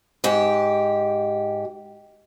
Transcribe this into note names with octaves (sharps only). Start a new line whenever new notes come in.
G#2 G4